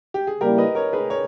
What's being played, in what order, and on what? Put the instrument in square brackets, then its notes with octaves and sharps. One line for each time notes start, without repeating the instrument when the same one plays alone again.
[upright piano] G4
G#4
[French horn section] C#3 G3 A#3 E4 [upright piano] G4 A#4
[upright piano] B4 D#5
A#4 C#5
G#4 B4
A#4 C#5